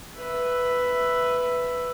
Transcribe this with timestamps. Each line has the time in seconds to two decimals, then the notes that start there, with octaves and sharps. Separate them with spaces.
0.18 B4 E5